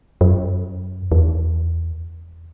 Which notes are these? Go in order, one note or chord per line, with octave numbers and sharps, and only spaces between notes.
F#2
E2